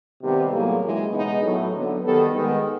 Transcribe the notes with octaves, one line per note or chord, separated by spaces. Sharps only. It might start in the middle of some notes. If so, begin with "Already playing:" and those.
C3 D#3 G3 B3
A2 F#3 A#3 G#4
C#3 E3 G#3
B2 G#3 B3 D#4
A2 F#3 A3
D3 F#3 B3
D#3 G3 B3 A4
D#3 G#3 B3